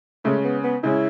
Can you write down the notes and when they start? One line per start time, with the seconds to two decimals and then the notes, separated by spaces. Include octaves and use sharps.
0.25 C#3 G#3 A3 C#4
0.44 B3
0.64 B3
0.83 C#3 G#3 C#4 E4